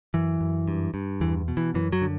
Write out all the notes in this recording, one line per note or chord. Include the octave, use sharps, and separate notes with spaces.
F#2 E3
F#2
G2
G2
E2 E3
B2
E3
F#2 E3
F#3
D3